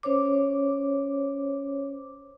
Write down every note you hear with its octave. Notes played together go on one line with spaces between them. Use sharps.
C#4 C5 C#5 D6